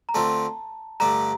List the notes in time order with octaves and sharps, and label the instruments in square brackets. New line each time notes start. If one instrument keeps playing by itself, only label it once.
[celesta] A#5
[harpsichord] D3 A3 C4 F4 [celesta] A5
[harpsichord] G2 D3 A3 D4 [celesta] A#5